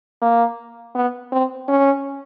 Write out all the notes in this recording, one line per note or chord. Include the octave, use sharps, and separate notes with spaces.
A#3
B3
C4
C#4